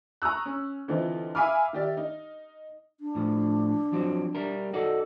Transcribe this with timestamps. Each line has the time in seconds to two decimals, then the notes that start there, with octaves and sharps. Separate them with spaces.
0.22 A#5 C#6 D#6 E6 F#6
0.46 C#4
0.88 D3 E3 C4 D#4 F4
1.35 E5 F5 G#5 B5 D6 F6
1.73 D#3 G4 D5 E5
1.97 D#4
3.00 D4
3.15 A2 F3
3.92 F3 F#3 C4
4.35 G3 A#4
4.73 D#4 F#4 A4 D5